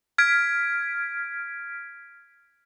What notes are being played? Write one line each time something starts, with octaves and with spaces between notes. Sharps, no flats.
F6 G#6 B6 D7